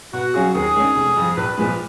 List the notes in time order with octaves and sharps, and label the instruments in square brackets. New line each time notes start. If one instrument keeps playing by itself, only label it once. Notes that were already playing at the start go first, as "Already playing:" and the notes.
[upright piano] B2 [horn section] F#4
[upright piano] F#3 C#4 F4 G#4
[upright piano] D#2 [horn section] G#4
[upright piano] D#3 G#3 C#4
F1
F2 F3
[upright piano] A#1 [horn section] B4
[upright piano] A#2 F3 G#3